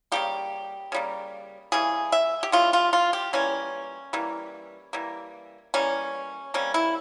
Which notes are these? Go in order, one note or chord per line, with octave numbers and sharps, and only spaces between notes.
C#3 G3 A#3 G4
C#3 G3 A#3
C#3 E3 G3 G#4
E5
G4
C#3 E3 G3 F4
F4
F4
G4
E3 G3 A#3 C#4
E3 G3 A#3
E3 G3 A#3
E3 G3 A#3 C#4
C3 G3 A#3 C#4
E4